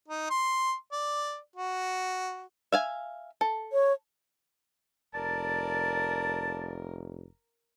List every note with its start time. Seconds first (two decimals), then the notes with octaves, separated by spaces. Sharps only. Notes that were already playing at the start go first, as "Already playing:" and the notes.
0.08 D#4
0.30 C6
0.92 D5
1.56 F#4
2.72 E5 F5 G#5
3.41 A4
3.73 C#5
5.14 F1 A#4 D5 A5